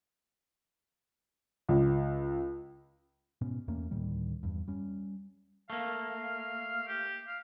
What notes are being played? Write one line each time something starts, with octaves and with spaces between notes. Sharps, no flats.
C#2
G#2 B2 B3 C#4
E2 A3 A#3 C#4
D2 A2 D#3 G3
E2 G2
G3 C#4
A3 A#3 F5
G4
F5